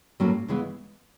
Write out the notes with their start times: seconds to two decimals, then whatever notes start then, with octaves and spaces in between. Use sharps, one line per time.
0.20 A2 F#3 A#3 C#4
0.48 C#3 E3 G#3 B3